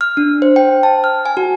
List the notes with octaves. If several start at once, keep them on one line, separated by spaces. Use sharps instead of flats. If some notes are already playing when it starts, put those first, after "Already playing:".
F6
D4
C5
G5
A5
F6
G#5
F#4